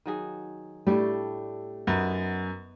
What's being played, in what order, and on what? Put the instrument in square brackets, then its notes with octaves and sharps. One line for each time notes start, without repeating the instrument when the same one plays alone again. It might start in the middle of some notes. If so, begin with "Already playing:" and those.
[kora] D#3 F#3 G#4
[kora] A2 G3 [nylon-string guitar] A3 D4 G4
[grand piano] F#2 [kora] B3 D#4